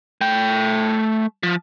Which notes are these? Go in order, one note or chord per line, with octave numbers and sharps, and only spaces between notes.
A3 G5
F3